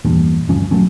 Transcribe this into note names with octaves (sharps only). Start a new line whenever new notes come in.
E2 G2 A#2
D2 G2 F3 C#4
A#1 F#3 A3 C#4